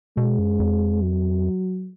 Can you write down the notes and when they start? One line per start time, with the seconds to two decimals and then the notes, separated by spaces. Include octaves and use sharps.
0.16 B2 G#3
0.39 F#2
0.60 F2
1.02 F#3